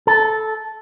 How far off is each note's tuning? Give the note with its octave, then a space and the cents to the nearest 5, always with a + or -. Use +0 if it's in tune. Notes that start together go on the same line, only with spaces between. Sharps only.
A4 -10